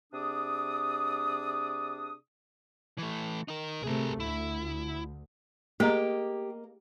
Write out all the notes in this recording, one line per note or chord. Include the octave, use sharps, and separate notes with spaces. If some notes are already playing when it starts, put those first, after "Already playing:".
C3 D4 G#4 D5 D#6
E3 A3
D#4 A#4
C3 A3 G#4 A#4
D2 E4
A3 A#3 G4 G#4 D#5 A#5